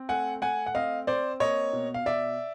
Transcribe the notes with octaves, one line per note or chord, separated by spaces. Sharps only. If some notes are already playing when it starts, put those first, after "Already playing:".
Already playing: C4
A3 F#5 G#5
A3 F#5 G#5
F#5
C4 D#5 F5
C4 C5 D5
A#3 C#5 D#5
B2
F5
B2 D5 E5